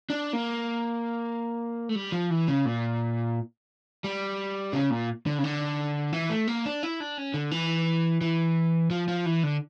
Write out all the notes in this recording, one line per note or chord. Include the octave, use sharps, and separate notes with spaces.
D4
A#3
A3
G3
F3
E3
C#3
A#2
G3
C#3
A#2
D3
C#3
D3
E3
A3
A#3
D4
E4
D4
C#4
D3
E3
E3
F3
F3
E3
D3